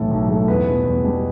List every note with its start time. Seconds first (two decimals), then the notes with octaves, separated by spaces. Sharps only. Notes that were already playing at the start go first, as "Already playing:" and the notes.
Already playing: B1 A2 E3 A3 A4
0.11 B1
0.29 A2 E3 A3
0.48 E2 B4
0.67 B2 G3
0.85 E2
1.04 B2 G3